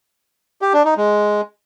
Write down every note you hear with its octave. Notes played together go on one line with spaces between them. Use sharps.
G4
D4
D#4
G#3